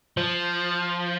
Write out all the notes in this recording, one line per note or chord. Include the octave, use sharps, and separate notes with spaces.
F3